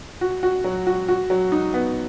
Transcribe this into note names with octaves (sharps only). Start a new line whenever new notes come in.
F#4
F#4
F#3
F#4
F#4
F#3
D#4
B3